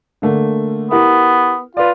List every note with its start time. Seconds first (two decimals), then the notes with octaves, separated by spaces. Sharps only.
0.22 D3 A3 A#3
0.91 B3 E4 G4 A#4
1.77 F4 B4 D5